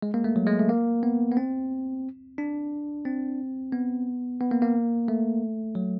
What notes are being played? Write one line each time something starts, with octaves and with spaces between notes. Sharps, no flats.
G#3
A#3
A3
F#3
G#3
A3
A#3
B3
B3
C4
D4
C4
B3
B3
A#3
A#3
A3
F#3